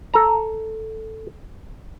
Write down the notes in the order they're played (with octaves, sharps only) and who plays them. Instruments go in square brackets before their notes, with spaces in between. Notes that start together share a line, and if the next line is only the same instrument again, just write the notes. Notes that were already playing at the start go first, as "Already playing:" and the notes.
[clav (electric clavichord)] A4 A#5